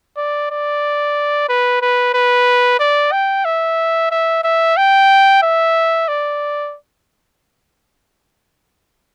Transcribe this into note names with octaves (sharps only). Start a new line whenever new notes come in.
D5
D5
B4
B4
B4
D5
G5
E5
E5
E5
G5
E5
D5